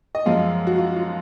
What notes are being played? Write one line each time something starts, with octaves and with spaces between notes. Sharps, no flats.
D#5
F#2 F3 G#3 F5
F#4
F4
F4